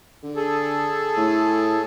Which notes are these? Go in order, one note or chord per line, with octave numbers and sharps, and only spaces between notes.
D3
G#4 A4
A2